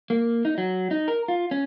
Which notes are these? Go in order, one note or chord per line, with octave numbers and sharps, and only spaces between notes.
A#3
D#4
F#3
D#4
A#4
F4
C#4